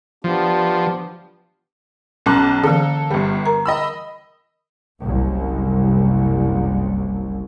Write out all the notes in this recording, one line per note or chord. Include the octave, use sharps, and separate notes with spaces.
F3 B3 D4 G4
B1 C#4 A5 A#5 D6 F#6
D3 E3 A#3 A4
G1 G3
A#4 A#5
D#5 B5 E6
F#1 C2